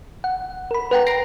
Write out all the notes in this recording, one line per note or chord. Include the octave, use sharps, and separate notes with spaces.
F#5
A#4 B5
B4 F#5 G5 A#5
A#6 C7 D7